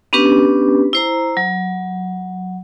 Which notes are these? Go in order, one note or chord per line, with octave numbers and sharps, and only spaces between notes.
B3 C#4 D4 G4 B4
E4 C5 A#5
F#3